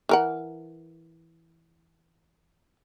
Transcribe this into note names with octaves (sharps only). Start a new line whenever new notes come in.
E3 A#4 F#5